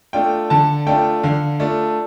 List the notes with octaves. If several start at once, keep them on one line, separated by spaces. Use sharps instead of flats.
A3 D4 F4 G5
D3 A5
A3 D4 F4 G5
D3 F5
A3 D4 F4